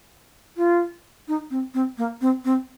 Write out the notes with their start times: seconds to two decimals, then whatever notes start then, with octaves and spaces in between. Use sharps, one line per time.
0.57 F4
1.28 D#4
1.51 C4
1.74 C4
1.98 A#3
2.21 C4
2.45 C4